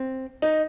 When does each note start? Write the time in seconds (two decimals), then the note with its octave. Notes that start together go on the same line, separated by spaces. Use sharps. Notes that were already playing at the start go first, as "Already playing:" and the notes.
Already playing: C4
0.42 D#4